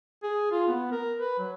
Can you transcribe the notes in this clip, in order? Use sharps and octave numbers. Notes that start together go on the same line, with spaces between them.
G#4
F4
B3
A#4
B4
F#3